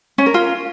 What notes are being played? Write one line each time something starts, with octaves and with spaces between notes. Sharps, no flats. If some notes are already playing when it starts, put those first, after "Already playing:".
C#4
A#4
F4